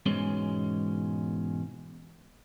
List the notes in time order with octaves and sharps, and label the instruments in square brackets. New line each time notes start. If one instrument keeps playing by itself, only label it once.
[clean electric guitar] E2 G#2 B2 G#3 C#4